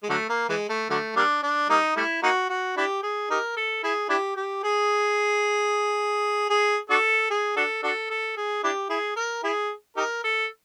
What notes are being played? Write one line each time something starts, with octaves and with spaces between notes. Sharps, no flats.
G#3
D3 F#3 A3
A#3
E3 G#3
A3
D3 F#3 A3
G3 A#3 D4
D4
G3 A#3 D#4
G3 A3 E4
A#3 D#4 F#4
F#4
D4 E4 G4
G#4
D#4 G4 A#4
A4
E4 G#4
D4 E4 G4
G4
G#4
G#4
D4 F#4 A4
G#4
D4 F#4 A4
D4 F#4 A4
A4
G#4
D4 E4 G4
E4 G#4
A#4
E4 G#4
D#4 G4 A#4
A4